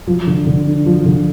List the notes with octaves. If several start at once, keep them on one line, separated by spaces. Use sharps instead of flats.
F3
D3
D3
D4
F3
D3